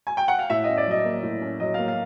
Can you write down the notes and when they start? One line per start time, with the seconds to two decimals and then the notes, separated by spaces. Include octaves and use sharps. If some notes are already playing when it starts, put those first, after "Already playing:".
0.07 G#5
0.17 G5
0.28 F#5
0.39 F5
0.50 A2 E5
0.64 C#4 D#5
0.77 D5
0.86 F#3 D#5
1.05 A#3
1.23 A2
1.41 C#4
1.60 F#3 D#5
1.74 A#3 F5
1.88 F5